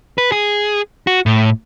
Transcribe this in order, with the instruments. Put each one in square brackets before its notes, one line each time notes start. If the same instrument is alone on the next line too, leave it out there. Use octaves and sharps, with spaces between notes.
[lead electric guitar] B4
G#4
F#4
A2